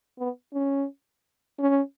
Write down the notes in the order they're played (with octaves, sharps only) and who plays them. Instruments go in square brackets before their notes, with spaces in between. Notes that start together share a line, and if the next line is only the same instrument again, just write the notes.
[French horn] B3
C#4
C#4